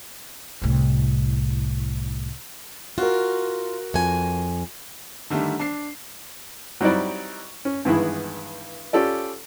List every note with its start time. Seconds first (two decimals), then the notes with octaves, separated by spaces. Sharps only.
0.62 C2 A2
2.98 F4 F#4 A#4
3.94 F2 G#5
5.30 D3 D#3 G3 A3
5.60 D4 C7
6.81 F#3 G3 C4 D#4 E4 D5
7.65 C#4
7.85 G2 D#3 E3 G#3 B3 E4
8.93 C#4 F4 G4 A4 D5